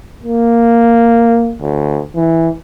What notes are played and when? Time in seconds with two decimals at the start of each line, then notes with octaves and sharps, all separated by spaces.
0.24 A#3
1.61 D2
2.16 E3